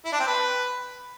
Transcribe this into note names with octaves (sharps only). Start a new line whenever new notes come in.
E4
D4
C4
B4